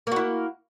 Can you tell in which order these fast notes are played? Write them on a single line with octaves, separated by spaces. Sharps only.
A#3 F#4 E4